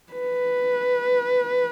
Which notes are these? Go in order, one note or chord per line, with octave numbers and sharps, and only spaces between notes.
B4